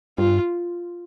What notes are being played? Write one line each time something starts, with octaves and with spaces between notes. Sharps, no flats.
G2 F4